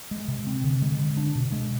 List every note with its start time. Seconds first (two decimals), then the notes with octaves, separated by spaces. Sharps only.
0.11 G#3
0.28 C3
0.47 C4
0.64 D3
0.82 G#3
0.99 D3
1.17 D4
1.35 B2
1.52 G#3